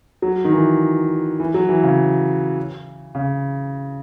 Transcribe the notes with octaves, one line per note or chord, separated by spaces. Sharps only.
F#3
D#3
E3
E3
F#3
E3
C#3
C#3